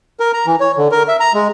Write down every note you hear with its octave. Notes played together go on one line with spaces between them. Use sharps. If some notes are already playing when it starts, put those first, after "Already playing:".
A#4
A#5
E3
C#5
D3
A#4
E5
A#5
G#3